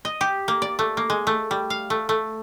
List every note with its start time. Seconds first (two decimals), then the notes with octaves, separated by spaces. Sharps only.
0.05 D#5
0.21 G4
0.48 A#3
0.62 D5
0.79 A3
0.97 A#3
1.10 G#3
1.27 A3
1.51 G3
1.70 F5
1.90 A3
2.09 A3